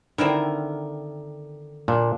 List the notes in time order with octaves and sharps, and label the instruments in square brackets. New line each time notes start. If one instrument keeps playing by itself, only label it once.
[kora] D3 D#3 [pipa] C4 E4 A#4
[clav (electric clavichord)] A#2 [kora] D4